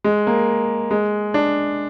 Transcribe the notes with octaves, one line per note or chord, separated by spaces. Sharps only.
G#3
A#3
G#3
D4